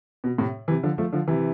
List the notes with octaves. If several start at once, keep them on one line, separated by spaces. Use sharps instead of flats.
B2
A2 C3
C3 E3
D3 F3
F3 A3
D3 F3
C3 E3